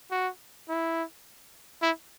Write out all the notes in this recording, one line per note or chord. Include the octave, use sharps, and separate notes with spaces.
F#4
E4
E4